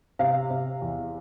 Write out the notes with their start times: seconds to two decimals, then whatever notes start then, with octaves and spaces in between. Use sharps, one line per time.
0.19 C3 F5
0.51 C3
0.82 E2